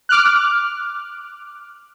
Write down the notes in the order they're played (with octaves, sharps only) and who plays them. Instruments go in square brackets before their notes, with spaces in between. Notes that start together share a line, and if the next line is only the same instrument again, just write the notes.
[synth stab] D6 F6 F#6